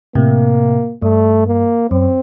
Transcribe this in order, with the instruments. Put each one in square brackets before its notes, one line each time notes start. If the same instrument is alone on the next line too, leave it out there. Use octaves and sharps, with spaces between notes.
[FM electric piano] A2 C3 [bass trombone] A#3
[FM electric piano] G2 [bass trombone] A3
[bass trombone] A#3
[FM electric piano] F#2 [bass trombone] C4